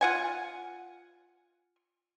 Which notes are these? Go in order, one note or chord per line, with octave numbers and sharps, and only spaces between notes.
F4 F#5 G#5